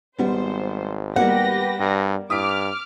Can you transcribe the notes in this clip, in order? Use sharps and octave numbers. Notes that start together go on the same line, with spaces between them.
G#1 G3 B3 C5
G3 A#3 B3 G4 B4 F#5 A#6
G2
G2 D6 D#6 F6 B6 D7